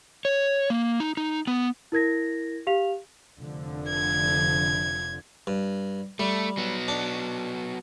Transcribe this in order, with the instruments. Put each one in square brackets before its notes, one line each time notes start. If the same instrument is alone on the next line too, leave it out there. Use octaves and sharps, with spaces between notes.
[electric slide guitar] C#5
A#3
D#4
D#4
B3
[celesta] E4 A#4 G#6 A#6
G4 F5 F7
[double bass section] F1 D3 F3
[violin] G#6
[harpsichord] G2
[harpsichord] G3 [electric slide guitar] A3
[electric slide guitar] F#3 B3
[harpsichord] D4